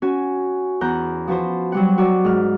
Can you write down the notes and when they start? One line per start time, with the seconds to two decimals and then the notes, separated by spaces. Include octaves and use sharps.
0.02 C#4 F#4 G#5
0.81 E2 A#5 F#6 G6
1.27 F3 F#4 B4 C5
1.72 F#3 G3 F#5
1.98 F#4 D5
2.25 G#2 F6